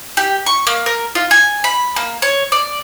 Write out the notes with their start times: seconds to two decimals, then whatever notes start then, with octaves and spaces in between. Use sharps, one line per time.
0.17 G4
0.46 C#6
0.67 A#3
0.86 A#4
1.15 F4
1.31 G#5
1.64 B5
1.96 A#3
2.22 C#5
2.52 D5